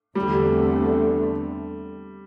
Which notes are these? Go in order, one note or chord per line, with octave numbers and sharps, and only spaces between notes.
E2 D3 G3 A3 C4